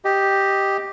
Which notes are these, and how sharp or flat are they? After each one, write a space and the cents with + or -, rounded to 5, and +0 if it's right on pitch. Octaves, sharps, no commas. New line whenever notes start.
G4 +0 D#5 +0